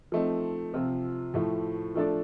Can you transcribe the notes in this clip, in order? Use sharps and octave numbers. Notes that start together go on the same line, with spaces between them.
F3 A3 C4 D#4
C3 F3 C4 F4
A2 F3 A3
F3 A3 D4 A4 D5